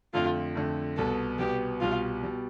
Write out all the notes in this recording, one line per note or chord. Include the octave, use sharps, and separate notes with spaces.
F2 D3 A3 F4
F2 D3 A3
C2 B2 B3 A4
C2 B2 B3 G4
C2 B2 G3 F4
B2 G3